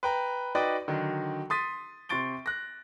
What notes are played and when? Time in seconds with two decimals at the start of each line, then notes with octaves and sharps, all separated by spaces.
0.03 B4 G5 A#5
0.55 D#4 F#4 B4 D5 D#5 G5
0.88 D3 D#3 F#3
1.50 C6 D#6 A6 B6 D#7
2.09 C3 C6 C#6 A6 D7 G7
2.46 F#6 A#6